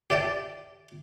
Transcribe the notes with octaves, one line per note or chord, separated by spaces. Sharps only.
G4 D5 E5 G5 A5